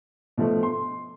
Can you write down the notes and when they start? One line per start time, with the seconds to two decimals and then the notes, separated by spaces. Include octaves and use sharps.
0.38 B2 F3 A3
0.63 C6